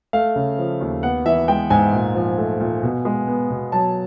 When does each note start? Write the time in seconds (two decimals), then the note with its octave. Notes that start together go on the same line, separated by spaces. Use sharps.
0.13 A3 F5
0.36 C#3
0.58 F3
0.81 D#2
1.03 B3 F#5
1.26 E3 E5
1.48 G#3 G5
1.70 G#2 G#5
1.93 A#2
2.15 F3
2.38 A3
2.60 A#2
2.83 B2
3.05 G#3
3.28 B3
3.50 B2
3.72 F#3 A5